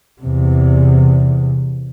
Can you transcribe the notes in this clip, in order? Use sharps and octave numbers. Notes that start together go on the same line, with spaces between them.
E2 C3